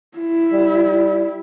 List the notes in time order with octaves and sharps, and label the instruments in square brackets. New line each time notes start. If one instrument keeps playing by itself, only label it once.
[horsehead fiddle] E4
[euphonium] G3